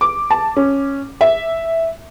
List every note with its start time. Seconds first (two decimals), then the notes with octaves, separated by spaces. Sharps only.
0.01 D6
0.31 A5
0.57 C#4
1.21 E5